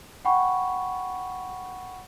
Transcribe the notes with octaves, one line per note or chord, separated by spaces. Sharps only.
F#5 G5 B5 C#6